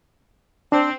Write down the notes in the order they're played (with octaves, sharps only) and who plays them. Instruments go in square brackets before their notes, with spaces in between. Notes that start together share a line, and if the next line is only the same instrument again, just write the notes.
[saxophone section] C4 [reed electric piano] D4